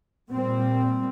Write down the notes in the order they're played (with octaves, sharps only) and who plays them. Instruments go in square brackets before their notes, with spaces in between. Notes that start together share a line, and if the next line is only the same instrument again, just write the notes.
[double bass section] A#2 G3 C4